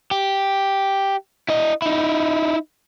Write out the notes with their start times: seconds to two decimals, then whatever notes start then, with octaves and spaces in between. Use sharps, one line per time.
0.11 G4
1.48 E4 D#5
1.82 D#4 E4